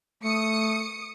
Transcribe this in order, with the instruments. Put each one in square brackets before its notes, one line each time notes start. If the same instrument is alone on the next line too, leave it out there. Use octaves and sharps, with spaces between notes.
[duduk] A3 [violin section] D#6 C#7